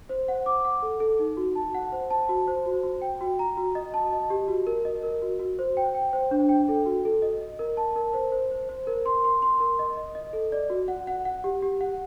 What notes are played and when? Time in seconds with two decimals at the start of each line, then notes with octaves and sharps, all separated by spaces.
0.09 C5
0.28 F#5
0.46 D6
0.65 F#5
0.82 A4
1.00 A4
1.19 D#4
1.37 F#4
1.55 A5
1.74 F#5
1.92 C5
2.11 A5
2.29 F#4
2.48 C5
2.66 F#4
2.83 F#4
3.02 G5
3.21 F#4
3.39 A#5
3.57 F#4
3.75 D#5
3.94 A5
4.12 D#5
4.30 G4
4.48 F#4
4.67 A#4
4.85 D#5
5.04 A#4
5.22 F#4
5.39 F#4
5.59 C5
5.77 G5
5.95 G5
6.13 C5
6.31 D4
6.49 G5
6.69 A4
6.86 F#4
7.05 A4
7.22 D#5
7.41 D#5
7.59 A#4
7.77 A5
7.96 A#4
8.14 C5
8.32 C5
8.51 C5
8.69 C5
8.87 A#4
9.06 C6
9.25 C6
9.42 C6
9.60 A#4
9.79 D#5
9.97 D#5
10.15 D#5
10.33 A4
10.52 D5
10.70 F#4
10.88 F#5
11.07 F#5
11.25 F#5
11.44 G4
11.62 G4
11.81 F#5